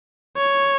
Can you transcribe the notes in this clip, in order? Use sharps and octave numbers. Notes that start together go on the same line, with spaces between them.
C#5